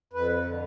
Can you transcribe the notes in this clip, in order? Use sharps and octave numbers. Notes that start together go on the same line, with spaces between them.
F2 B4
D3